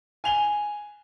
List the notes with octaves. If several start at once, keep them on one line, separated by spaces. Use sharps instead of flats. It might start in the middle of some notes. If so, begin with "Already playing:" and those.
G#5 F7 G7